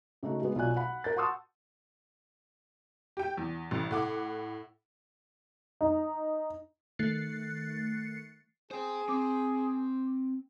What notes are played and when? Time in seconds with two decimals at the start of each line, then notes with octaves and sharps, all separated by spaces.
0.23 C#3 A3 D#4 F#4
0.42 G#3 B3
0.55 B1 F#3 F4 D5 G#5 F#6
0.77 F#5 B5
1.04 A#4 G6 A6
1.16 F#5 A5 C6 C#6 D#6 E6
3.17 G4 G5
3.38 E2
3.71 A1
3.91 A2 F#5 D6
5.81 D#4
6.99 D#3 A3 F#6 A6 C7 C#7
8.71 G#4 C5 G5
9.09 C4 D6